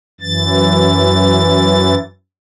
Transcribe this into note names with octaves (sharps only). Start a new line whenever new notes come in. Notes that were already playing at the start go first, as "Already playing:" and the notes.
F#2 E3 A6